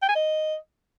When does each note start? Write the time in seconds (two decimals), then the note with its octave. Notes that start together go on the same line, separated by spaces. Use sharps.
0.03 G5
0.09 G#5
0.15 D#5